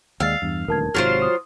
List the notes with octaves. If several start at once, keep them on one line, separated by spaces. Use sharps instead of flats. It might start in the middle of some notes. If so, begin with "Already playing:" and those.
D#2 G#3 F5 E6 A6 C7
E2 G2
D#1 D2 E3 A#4 A5 G#6
G#1 G#2 C3 F#3 F4 C5 F6 D7
D#6